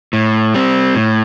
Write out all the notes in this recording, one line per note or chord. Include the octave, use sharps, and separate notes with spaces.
A2
G3 C4
A2